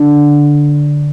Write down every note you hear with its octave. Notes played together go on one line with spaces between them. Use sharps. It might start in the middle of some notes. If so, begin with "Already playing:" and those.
Already playing: D3